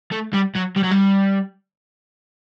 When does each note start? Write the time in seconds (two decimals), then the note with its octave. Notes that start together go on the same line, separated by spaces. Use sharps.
0.12 A3
0.33 G3
0.55 F#3
0.76 G3
0.83 F#3
0.91 G3